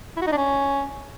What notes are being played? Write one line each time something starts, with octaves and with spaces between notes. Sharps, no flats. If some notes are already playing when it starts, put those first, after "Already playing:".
E4
F#4
D#4
D4
C#4